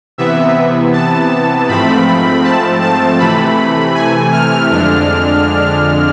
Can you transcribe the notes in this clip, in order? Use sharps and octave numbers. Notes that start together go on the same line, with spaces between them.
C3 E3 B3 E5
A5
G#2 F3 A3 C4 B5
A5
A5
C3 E3 A3 B5
G#5
F6
F2 D3 G#3 D4 F6